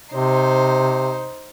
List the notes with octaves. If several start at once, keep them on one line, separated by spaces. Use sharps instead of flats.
C3 D#4 C5